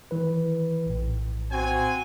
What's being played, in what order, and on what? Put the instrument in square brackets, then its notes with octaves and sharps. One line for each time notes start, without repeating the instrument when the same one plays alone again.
[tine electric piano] D#3 E3 B4
A#1 A2
[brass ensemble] C4 F#4 G#5